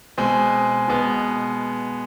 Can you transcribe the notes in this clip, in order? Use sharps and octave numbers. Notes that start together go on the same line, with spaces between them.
B2 G#3 C4 G#4
B2 G#3 B3